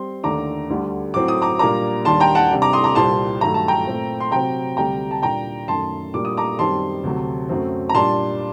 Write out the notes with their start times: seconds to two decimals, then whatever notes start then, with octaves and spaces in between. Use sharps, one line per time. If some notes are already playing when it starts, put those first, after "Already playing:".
Already playing: G3 C4 C6
0.23 D#2 D3 A3 D4 A#5 D6
0.70 D2 D3 G3
1.14 A2 F#3 C4 D6
1.28 D#6
1.42 A#5 D6
1.59 A#2 G3 A#3 D4 A#5 D6
2.05 D#2 D#3 G3 D4 A5 C6
2.20 G5 A#5
2.35 F#5 A5
2.50 C3 G3 D4
2.62 A#5 D6
2.73 C6 D#6
2.84 A#5 D6
2.95 C2 A#2 G3 C4 A5 C6
3.41 G2 D#3 F#3 A3 A#5
3.54 A5
3.68 G5 A#5
3.87 A#2 A3 C4
4.20 C6
4.32 C3 F#3 C4 G5 A#5
4.77 D2 C3 G3 G5 A#5
5.11 A5
5.22 A#2 G3 D4 G5 A#5
5.68 F#2 D#3 A3 A5 C6
6.14 A#2 G3 A#3 D4 D6
6.25 D#6
6.37 A#5 D6
6.59 F#2 D#3 G3 C4 A5 C6
7.03 D2 C3 F#3
7.49 F#2 F#3 A3 C4
7.89 A#5
7.94 A#2 G3 D4 A5 C6